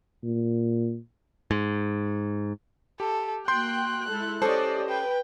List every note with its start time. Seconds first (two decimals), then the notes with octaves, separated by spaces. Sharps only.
0.23 A#2
1.51 G#2
3.00 G4 A4
3.48 A#3 F#4 G5 C6 F#6 G6
4.09 G#3 E4 A4
4.42 C#4 G4 A4 C5 D5 D#5
4.89 B4 G5